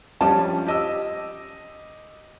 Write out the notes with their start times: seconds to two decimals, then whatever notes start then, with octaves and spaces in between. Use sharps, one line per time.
0.21 F3 G3 C#4 D4 A5
0.66 G4 D#5 E6